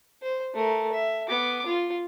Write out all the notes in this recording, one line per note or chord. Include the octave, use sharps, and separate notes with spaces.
C5
A3 A#4
E5
B3 D6
F4